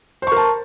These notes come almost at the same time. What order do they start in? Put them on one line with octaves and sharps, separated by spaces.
C5 C#6 A#4 A5